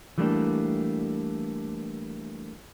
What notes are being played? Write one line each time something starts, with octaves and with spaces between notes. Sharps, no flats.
E3 G3 A3 A#3 D4